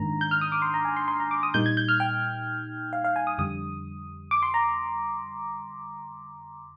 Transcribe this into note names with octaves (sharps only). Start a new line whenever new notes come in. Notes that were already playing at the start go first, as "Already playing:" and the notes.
Already playing: G#2 D#3 A#3 D4 A#5
G6
F6
D#6
D6
C6
A#5
G#5
C6
C6
A#5
D6
D#6
A#2 G3 A#3 D#4 G6
G#6
G6
F6
G5
F5
F5
G#5
D#6
F2 D3 G3 D#6
D6
C6
A#5